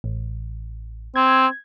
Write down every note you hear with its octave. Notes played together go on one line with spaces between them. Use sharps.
A1
C4 G#6